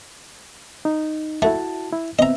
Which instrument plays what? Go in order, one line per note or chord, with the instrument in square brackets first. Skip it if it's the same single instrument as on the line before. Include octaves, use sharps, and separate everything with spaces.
[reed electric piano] D#4
[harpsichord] A3 [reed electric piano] E4 F#4 A5
[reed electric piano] E4
[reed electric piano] B3 C4 E5 [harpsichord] D#5 A#5